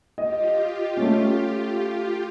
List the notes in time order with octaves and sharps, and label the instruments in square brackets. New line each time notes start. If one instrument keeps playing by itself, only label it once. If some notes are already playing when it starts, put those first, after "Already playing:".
[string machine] F4 G4 [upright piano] D#5
[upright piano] A3 C#4